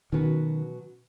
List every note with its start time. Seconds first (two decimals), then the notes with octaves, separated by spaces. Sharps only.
0.12 B2 D#3 F#3 C#4 F#4 B4